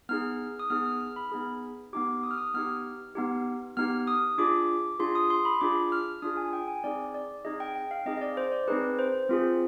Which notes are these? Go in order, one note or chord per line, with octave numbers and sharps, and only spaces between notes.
B3 D#4 G#4 F6
D#6
B3 D#4 G#4 F6
F6
F6
B5
B3 D#4 G#4
B3 D#4 G4 D6
D#6
F6
D#6
B3 D#4 G4 F6
B3 D#4 G4
B3 D#4 G4 F6
D#6
D4 F4 G#4 D6
D4 F4 G#4 C6
D#6
C6
B5
D4 F4 G#4 D6
F6
D4 F4 G#4 D#6
G#5
G5
G#5
C4 D#4 G#4 D5
D5
C4 D#4 G#4 D#5
G5
G5
F5
C4 D#4 G#4 D#5
D#5
D5
C5
D5
C4 D#4 G#4 B4
C5
C4 F4 G#4